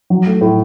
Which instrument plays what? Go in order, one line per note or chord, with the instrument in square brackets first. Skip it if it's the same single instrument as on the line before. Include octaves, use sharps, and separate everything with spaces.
[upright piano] F#3
A3
A2